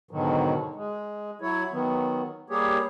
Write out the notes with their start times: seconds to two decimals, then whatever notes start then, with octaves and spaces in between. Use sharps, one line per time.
0.11 G#2 B2 D3 D#3 F#3
0.75 G#3
1.41 F#3 E4 C#5
1.73 D#3 F#3 B3
2.50 G3 A#3 G4 G#4 C#5